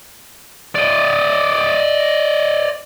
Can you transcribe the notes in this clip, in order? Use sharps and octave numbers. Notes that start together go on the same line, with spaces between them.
D5 D#5